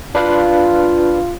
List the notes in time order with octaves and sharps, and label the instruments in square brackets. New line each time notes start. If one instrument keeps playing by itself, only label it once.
[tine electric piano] D4 B4 F5 [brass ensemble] F4